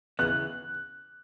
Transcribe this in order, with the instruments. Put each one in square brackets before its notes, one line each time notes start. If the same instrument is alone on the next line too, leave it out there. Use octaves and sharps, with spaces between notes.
[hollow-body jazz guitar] C#3 E3 B3 [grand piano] F#6